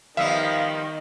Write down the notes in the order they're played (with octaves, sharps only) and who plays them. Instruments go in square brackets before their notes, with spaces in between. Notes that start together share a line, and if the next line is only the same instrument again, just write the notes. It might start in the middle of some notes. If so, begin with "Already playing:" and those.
[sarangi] D#3 [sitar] F3 G3 B3 [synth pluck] E5 [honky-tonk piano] F5